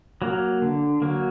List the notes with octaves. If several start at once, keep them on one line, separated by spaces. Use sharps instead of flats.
F#3 A#3
D3
F#3 A#3